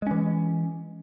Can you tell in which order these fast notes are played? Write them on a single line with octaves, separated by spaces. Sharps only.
G#3 C#4 E3